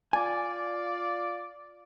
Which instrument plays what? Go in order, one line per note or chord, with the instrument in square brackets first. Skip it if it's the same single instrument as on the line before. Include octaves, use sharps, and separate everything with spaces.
[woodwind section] F4 D5 [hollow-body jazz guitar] G#5